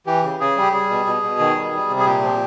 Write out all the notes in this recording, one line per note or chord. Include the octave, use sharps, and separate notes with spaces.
E3 G4
C#3
C#3 G#4
G3 G4
G3 G#4
B2
B2
B2
D#3
G3
G3
C3
G#4
A#2 G4
F3